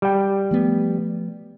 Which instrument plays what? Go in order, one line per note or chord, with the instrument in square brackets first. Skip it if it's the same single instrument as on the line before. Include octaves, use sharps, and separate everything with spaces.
[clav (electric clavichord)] G3 G5
[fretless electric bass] F3 A3 B3